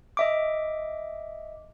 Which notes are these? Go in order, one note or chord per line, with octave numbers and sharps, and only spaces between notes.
D#5 E5 D6